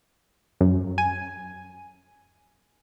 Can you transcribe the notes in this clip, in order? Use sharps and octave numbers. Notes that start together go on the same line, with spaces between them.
F#2
G#5